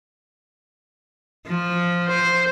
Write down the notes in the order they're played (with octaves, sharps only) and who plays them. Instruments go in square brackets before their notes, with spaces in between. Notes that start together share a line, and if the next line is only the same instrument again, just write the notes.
[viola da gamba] F3
[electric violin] C5